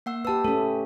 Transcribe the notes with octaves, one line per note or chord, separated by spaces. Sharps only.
A#3 F#5 E6
G4 B4 A5 E6
A3 C#4 A4